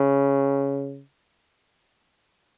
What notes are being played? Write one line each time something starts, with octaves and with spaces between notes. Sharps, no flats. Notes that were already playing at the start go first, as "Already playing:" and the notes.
Already playing: C#3